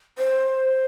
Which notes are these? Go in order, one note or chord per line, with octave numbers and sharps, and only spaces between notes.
C5